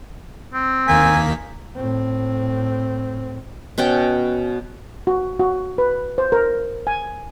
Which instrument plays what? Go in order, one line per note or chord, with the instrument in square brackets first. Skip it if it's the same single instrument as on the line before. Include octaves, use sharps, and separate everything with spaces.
[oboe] C4
[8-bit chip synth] D#2 D#3 B6 [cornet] A#3 [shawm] G#5
[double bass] A2 C4
[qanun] B2 C#4 F#4 G5
[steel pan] F#4
F#4
B4
C5
A#4
G#5